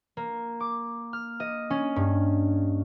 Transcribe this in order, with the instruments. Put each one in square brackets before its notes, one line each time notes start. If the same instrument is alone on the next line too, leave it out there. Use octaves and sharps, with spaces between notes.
[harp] A#3
D6
F6
D#5
C#4
G2